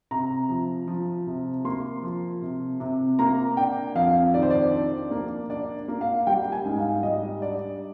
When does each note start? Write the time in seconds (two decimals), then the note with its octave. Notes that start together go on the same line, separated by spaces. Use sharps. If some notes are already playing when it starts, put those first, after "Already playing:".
0.11 C3 A#5
0.49 F3
0.88 F3
1.27 C3
1.65 A#3 C6
2.03 F3
2.41 C3
2.80 C3
3.19 A#3 A#5
3.57 D4 G5
3.95 F2 F5
4.34 D#3 D5
4.42 C5
4.50 D5
4.73 D4
5.11 A#3
5.50 D4 D5
5.88 A#3
6.01 F5
6.27 G3 G5
6.52 G#5
6.65 G#2
6.78 F5
7.03 G3 D#5
7.42 D4 D5